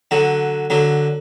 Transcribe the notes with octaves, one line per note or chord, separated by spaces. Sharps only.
D3 F#3
D3 F#3